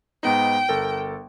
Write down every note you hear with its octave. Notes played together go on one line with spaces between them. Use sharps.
G#2 B3 D#4 G5
G1 A4 A#4